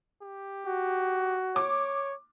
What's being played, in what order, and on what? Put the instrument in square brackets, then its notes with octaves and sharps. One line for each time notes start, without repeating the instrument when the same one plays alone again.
[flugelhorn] G4
[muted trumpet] F#4
[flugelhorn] C#5 [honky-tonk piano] D6